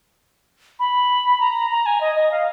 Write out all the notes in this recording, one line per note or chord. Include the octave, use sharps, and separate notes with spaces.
B5
A#5
A#5
G#5
D#5
D#5
F5